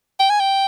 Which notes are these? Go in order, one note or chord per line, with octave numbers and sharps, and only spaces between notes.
G5
G#5
G5